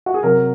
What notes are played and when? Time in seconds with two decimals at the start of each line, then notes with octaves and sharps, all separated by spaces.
0.06 F#4
0.14 G#4
0.23 C3 F#3 A#4